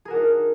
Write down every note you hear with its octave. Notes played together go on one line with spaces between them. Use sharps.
D4 D#4 F#4 G#4 A#4